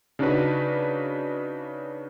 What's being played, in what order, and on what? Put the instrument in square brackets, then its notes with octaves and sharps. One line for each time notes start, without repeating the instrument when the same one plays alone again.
[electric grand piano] C#3 D4 D#4 F#4 B4